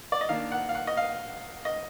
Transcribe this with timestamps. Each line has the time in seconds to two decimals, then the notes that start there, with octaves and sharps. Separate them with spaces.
0.12 D5
0.21 D#5
0.29 D#3 A#3 D4 F5
0.52 F#5
0.69 F5
0.75 F#5
0.87 D#5
0.97 F5
1.65 D#5